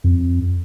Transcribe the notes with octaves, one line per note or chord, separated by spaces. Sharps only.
F2